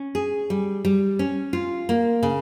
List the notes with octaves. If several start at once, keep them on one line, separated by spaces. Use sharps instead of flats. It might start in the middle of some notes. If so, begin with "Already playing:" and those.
Already playing: C#4
G#4
G3
G3
C#4
F4
A#3
C#3